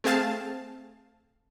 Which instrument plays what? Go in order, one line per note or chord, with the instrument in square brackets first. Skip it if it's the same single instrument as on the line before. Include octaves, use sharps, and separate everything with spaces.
[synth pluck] A3 C4 G#4 F5 A5